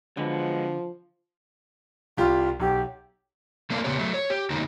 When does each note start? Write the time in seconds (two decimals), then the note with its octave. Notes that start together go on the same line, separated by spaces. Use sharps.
0.17 D3 F3 F#3 G#3 B3
2.17 C2 F4 G4
2.60 B1 G4
3.70 A3 A#3 D4 A4 A#4 F5
3.84 A#2 C#3 B3 G4 C#5
3.96 F#3 A3
4.14 C#5
4.30 G4
4.50 E2 D3 A#3 D#4 F#4